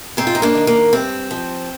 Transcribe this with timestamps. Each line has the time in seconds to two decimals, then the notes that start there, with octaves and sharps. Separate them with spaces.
0.17 G#2 C4
0.27 F4
0.35 D#4
0.42 A#3 D4
0.55 D#3
0.67 A#3 D4
0.93 G2 C4
1.31 F3